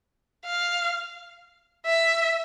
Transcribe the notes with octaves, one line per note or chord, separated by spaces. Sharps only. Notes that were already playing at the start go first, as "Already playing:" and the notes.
F5
E5